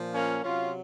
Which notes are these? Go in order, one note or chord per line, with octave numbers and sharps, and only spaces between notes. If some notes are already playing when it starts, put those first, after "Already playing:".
Already playing: A#2 F3
A#3 C#4
C3 F#3 C#4 F4